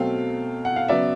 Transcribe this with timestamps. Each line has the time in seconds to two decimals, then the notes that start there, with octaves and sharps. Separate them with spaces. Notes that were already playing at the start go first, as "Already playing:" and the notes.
Already playing: B2 F#3 A3 C4 F5 G5
0.65 F#5
0.76 F5
0.88 C#3 F#3 B3 D5 E5